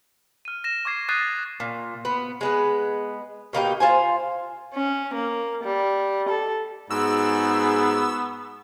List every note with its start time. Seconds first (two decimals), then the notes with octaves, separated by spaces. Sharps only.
0.45 F6 D#7
0.64 A#6 E7
0.85 C#6 D6 G#6 C7
1.09 D#6 F#6 G#6 A6 C7 D#7
1.60 A#2
2.05 B3
2.41 G#3 B3 B4
3.53 B2 A#3 D#4 G4
3.80 F4 C5 G#5
4.74 C#4
5.13 A#3
5.64 G3
6.29 A4
6.91 G#2 B3 F#4 G#4 E6